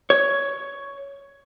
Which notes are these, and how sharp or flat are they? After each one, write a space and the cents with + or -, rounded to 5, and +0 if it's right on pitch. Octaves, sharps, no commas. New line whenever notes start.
C#5 +10